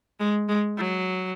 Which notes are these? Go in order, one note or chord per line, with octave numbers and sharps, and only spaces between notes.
G#3
G#3
F#3